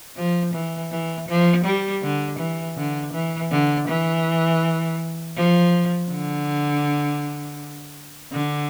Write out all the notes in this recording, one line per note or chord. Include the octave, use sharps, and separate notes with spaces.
F3
E3
E3
F3
G3
D3
E3
D3
E3
D3
E3
F3
D3
D3